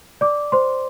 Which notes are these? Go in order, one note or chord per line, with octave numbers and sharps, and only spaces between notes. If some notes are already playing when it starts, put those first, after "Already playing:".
D5 D6
C5 C6